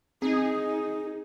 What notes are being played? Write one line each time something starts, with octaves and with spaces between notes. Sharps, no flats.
C4 D#4 G#4